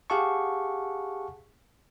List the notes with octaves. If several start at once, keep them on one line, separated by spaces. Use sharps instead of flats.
G4 G#4 F5 F#5 A5 C#6